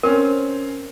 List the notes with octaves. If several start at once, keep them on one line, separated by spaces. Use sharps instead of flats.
C4 C#4 A#4